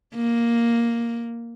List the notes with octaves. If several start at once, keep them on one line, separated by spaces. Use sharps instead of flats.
A#3